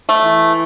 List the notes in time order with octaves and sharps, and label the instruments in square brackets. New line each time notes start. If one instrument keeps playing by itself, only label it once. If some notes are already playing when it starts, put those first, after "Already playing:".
[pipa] A3
[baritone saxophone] E3